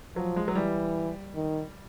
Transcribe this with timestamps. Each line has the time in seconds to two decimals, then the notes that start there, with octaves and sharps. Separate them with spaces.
0.16 F3 F#3
0.36 G#3
0.48 F#3
0.55 E3 G3
1.35 D#3